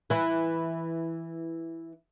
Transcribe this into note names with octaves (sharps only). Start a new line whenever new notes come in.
E3 E4